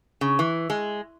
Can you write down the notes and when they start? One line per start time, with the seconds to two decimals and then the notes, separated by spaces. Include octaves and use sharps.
0.21 C#3
0.39 E3
0.70 G#3